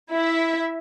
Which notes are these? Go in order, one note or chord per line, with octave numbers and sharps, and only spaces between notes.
E4 E5